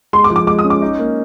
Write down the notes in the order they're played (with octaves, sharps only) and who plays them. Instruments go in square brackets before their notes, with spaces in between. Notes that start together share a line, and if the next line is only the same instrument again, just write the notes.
[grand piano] G#3 [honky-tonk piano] C6
[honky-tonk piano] D6
[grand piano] F3
[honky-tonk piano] D6
[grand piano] G#3 [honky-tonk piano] D6
[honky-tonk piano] D#6
[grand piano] C#4
[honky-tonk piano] D6
[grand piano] D#4
A#3